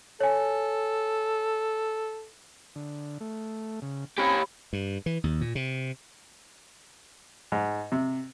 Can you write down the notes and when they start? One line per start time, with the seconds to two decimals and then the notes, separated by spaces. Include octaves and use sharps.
0.21 A4 C#5 G#5
2.76 D3
3.21 A3
3.82 C#3
4.18 C4 C#4 G4 C#5 G#5 B5
4.73 G2
5.06 E3
5.24 D#2
5.41 A#2
5.55 C3
7.52 G#2
7.92 C3